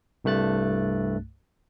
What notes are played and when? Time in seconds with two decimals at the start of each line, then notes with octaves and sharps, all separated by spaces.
0.24 C2 G2 A3 F#6 A6